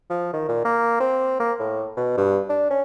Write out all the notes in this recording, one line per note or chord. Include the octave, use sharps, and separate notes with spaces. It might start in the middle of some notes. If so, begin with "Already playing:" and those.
F3
D#3
A#2
A#3
C4
A#3
A2
B2
G2
D4
C#4